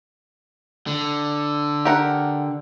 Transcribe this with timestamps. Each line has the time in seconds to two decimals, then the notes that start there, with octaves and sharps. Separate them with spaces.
0.87 D3
1.85 G4 A#4 F#5